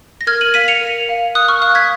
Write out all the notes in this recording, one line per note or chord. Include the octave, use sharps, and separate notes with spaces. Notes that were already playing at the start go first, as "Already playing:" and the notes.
A#6
A#4 F6 G#6
D#7 F#7
F5 B6 D#7
C#7 F7
A#4
F5
A#4 D#6 F#6
C#6 F6
F5 D#6 F#6
G#6 B6